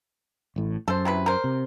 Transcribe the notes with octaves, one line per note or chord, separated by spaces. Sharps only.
A1 A2
F#2 A4 C5
C3 E4 B4
A#4 C5
C3